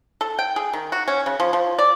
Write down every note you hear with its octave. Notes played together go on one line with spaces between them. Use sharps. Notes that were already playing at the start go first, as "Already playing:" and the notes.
A4
G5
G#4
D#3
F#4
C#4
C#3
F3
F3
D5